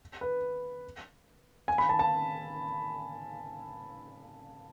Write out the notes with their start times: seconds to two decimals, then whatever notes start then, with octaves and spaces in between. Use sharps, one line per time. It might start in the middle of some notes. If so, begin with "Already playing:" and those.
0.21 B4
1.68 G#5
1.78 B5
1.89 A5
1.99 A5